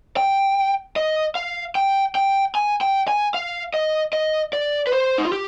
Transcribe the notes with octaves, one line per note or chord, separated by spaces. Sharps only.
G5
D#5
F5
G5
G5
G#5
G5
G#5
F5
D#5
D#5
D5
B4
C5
D#4
F4
G4